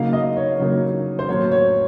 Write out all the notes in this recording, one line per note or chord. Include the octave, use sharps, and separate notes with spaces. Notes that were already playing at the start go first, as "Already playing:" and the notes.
Already playing: C#3 F#3 A#3 D#4 F5
D#5
C#5
C#3 F#3 A#3 D#4
C5
A2 F#3 A#3 C#5
C#5